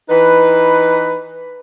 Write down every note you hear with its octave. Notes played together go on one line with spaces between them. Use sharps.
E3 D#4 B4